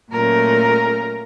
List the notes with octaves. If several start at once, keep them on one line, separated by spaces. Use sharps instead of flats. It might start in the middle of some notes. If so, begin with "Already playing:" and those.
A#2 F#3 A3 C#4 A#4